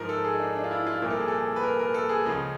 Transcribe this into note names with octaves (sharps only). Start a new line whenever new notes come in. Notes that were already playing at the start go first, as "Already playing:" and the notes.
Already playing: G#2 F3 A#4
A4
G#4
D#4
D4
D4
F4
E4
F4
C2 A#2 F3 A#4
A4
G#4
A4
B4
A#4
A#4
A4
G#4
C#2 C#3 F3